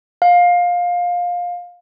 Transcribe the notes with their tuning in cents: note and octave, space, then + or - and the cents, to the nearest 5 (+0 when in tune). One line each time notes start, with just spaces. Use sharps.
F5 +20